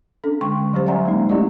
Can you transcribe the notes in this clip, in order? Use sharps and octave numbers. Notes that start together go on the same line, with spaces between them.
C#4 D4 A4
D3 G#3 G5 C6 C#6
F#3 G3 C#4 G4 C5
D5 E5 F#5 G#5 A#5 C6
F#3 G#3 A#3 D#4
A3 C#4 E4 G4 D5 D#5